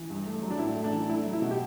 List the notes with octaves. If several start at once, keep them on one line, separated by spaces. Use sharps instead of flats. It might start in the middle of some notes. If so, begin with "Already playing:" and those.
Already playing: E3
G2
A3
F#3
D4
A2 E4
A3
D4
E3
A3 E4
F#3
E4
B2
G4